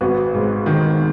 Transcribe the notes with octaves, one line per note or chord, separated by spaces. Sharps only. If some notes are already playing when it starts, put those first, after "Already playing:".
G#1 F#4 B4
G#2
D#3